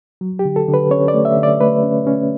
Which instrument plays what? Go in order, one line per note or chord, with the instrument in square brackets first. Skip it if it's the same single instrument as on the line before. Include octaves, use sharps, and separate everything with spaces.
[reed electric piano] F#3
G4
D3
A4
D3
B4
C#4 C#5
D5
A3
E5
D3
D5
A3 B4
C#4
C#4